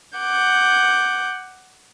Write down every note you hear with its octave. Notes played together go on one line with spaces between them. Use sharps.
F#5 D6 G6